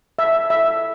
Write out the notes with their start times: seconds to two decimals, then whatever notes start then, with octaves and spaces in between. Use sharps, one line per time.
0.19 E5
0.50 E5